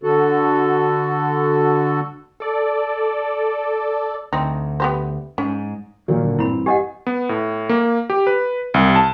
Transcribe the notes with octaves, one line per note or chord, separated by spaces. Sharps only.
D3 F#4 A4
A4 D5
D2 C4 D#4
B3 G4 C5
G#2 C#4
A#2 D#3 F3 F#3 A#3
G#1 D3 F#3
A1 G2 C4 E4 B5
G4 D#5 F#5 G#5
B3
A2
A#3
G4
B4
C2
A5